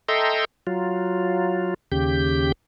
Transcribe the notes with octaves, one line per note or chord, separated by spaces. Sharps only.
A4 D#5 E5 G5 A#5 C6
F#3 F4
D#2 C#3 G4 G6